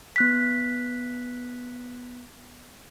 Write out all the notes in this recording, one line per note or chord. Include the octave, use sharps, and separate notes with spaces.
B3 F#6 B6